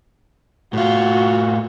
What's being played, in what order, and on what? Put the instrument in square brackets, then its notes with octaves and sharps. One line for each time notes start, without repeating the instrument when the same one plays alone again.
[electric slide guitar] A2 F4 [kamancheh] F#4